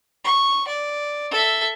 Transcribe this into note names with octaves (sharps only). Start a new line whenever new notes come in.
C#6
D5
A4 E5